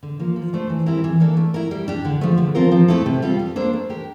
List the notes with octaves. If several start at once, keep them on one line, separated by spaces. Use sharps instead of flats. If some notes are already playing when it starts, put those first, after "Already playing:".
D3
F3 A#3
F3
A3 D4 A4 C5
E3
G3 C4 E4 A#4
E3
A#3 D4 A4
A3
E4 A#4
G3
D4 G4
D3
F3 A3
D3
F3 C4 F4 A#4
F3
A3 C4 E4 A4
C3
G3 C4 F4 A4
G3
A#3 D4 A4 C5
A3
D4 G4 A#4